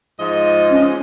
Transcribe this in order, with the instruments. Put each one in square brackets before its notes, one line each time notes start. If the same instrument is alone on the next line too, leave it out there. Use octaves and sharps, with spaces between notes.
[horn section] G#2 F3 D#5
[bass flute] C#4